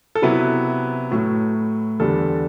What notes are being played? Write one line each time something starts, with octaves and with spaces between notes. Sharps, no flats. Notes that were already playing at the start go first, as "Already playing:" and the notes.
A4
C3 F#3 B3 E4 B4
A2 F#3 A3
E2 D3 G3 D4 A4